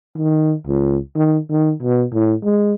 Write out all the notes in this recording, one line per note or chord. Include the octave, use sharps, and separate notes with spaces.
D#3
C#2
D#3
D#3
B2
A2
G#3